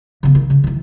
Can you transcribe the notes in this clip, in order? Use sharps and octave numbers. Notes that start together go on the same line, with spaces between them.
C#3 B3
D#3
C#3
D#3 E3